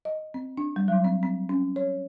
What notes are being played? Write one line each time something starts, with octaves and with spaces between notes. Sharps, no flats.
D#5
C4
D4
G3
F#3
C4
C4
C#4
C#5